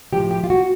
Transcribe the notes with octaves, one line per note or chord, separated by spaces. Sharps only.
A2 F3 G4
G4
F4
F#4